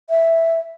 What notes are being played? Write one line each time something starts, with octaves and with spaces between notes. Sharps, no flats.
E5